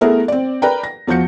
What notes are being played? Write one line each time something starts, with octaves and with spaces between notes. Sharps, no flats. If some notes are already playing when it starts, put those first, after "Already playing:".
A3 B3 E4 G#4 A#4
C4 D5
A#4 B4 D5 G5 A#5
A#6
E2 F3 F#4 G6 C#7